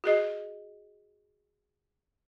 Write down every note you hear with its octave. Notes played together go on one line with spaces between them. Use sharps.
F#4 G#4 D#5